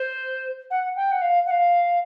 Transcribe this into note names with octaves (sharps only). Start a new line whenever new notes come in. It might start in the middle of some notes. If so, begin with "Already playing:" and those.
Already playing: C5
F#5
G5
F#5
F5
F#5
F5